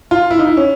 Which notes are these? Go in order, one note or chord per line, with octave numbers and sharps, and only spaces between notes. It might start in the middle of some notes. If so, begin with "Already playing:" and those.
F4
E4
D#4
E4
C#4